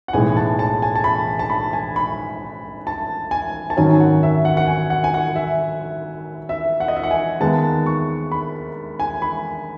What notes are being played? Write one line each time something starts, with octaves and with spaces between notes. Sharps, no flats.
F#5
B1 A2 E3 G#3 G#5
A5
A5
G#5
A5
B5
A5
B5
G#5
B5
A5
G#5
A5
G#1 F#2 D#3 F#3 C#4 G#5
F#5
E5
F#5
F#5
G#5
F#5
G#5
F#5
E5
E5
F#5
D#5
E5
F#5
G#5
D#2 D#3 G#3 B3 A5
C#6
B5
G#5
B5